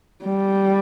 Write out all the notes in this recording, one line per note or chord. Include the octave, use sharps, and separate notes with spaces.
G3